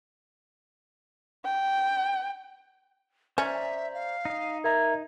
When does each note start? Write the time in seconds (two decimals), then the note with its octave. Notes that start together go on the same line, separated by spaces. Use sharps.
1.44 G5
3.38 C#4 C5 D5 E5 A#5
3.94 F5
4.25 D#4 D#5
4.64 A#4 E5 A#5 G#6